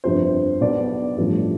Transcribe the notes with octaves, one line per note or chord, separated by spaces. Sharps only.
G1 F2 C3 F3 C5
B1 B2 B3 D4 D5
A1 G2 F3 A3